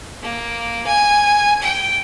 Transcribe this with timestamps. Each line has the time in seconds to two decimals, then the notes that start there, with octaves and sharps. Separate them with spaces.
0.22 A#3
0.86 G#5
1.62 G5